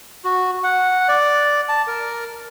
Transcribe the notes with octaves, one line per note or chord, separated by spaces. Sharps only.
F#4
F#5
D5
A5
A#4